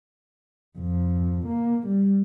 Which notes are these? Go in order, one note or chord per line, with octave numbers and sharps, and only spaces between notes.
F2
A#3
G3